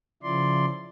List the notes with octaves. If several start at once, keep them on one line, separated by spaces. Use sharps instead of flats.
C#3 F3 E4 D5 C6